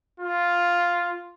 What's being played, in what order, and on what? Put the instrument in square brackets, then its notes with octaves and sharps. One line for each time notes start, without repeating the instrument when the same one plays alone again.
[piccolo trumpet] F4